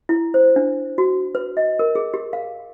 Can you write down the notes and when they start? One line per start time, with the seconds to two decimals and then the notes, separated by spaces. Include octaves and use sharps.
0.09 E4
0.34 C5
0.56 D4
0.98 F#4
1.35 B4
1.57 D#5
1.79 A#4
1.95 G#4
2.14 G4
2.33 F5